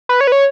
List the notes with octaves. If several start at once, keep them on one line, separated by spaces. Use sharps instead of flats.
B4
C#5
B4
C#5